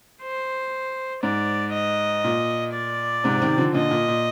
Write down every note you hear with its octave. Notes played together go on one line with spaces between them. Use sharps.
C5
G#2 D5
D#5
A#2
D5
G#2 C3
C3 D#3
D3 F3
A#2 D3 D#5
A#2
A#2